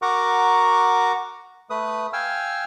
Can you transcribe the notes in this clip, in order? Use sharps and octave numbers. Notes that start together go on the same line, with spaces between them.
F#4 A#4 F#5 A#5 C#6 D6
A3 B4 D#6
F5 G5 G#5 E6 F6